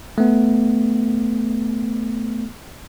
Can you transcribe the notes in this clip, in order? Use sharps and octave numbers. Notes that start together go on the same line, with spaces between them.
A3 B3